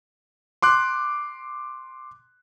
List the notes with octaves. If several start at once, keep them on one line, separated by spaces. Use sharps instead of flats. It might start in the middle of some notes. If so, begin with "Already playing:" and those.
C6 D6 F#6